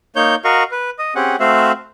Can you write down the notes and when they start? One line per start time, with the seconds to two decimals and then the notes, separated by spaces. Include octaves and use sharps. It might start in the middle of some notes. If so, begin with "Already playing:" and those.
0.16 A#3 D#4 C#5 G6
0.44 F#4 A#4 D#5 F5 C#6
0.71 B4
0.99 D#5 D#6
1.16 C4 C#4 G4 G#4 F#5
1.40 A3 C4 F#4 C5 E5 F5